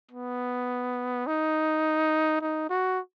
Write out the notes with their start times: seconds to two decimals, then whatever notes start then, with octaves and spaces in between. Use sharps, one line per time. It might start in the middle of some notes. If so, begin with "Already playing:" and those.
0.11 B3
1.27 D#4
2.41 D#4
2.69 F#4